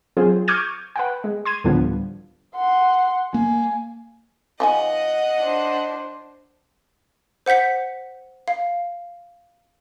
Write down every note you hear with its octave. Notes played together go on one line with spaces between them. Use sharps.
F#3 C4 F4 G#4 C5
C#6 D6 F6 G6 G#6 D#7
B4 F#5 G5
G#3
C6 G#6 D#7
D2 A2 D3 F3 G3 B3
F#5 C6
A#3 G#5
F3 D#4 D#5 F#5 G#5
D4 C5
C5 F#5 G6 B6 C#7
F5